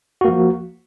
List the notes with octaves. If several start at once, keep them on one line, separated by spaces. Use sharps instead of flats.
F3 A#3 F#4